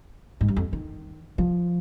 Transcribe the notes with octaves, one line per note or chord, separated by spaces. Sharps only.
G#2
G2
F2
D#3
F3